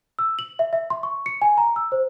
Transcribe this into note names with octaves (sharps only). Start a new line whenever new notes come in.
E6
F#7
E5
E5
C6
C#6
C#7
G#5
A#5
E6
C5